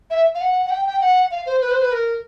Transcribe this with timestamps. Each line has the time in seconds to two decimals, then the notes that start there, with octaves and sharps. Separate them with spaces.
0.10 E5
0.35 F5
0.41 F#5
0.66 F#5
0.71 G5
0.86 G5
1.01 F#5
1.31 F5
1.46 C5
1.61 B4
1.71 C5
1.81 B4
1.92 A#4